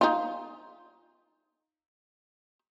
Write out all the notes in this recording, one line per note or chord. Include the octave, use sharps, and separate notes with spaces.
D#4 F4